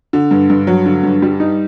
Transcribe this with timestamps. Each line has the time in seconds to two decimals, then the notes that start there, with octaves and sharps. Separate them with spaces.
0.13 D3
0.31 G2
0.50 G2
0.67 F#3
0.86 D3
1.03 G2
1.22 G3
1.40 D#4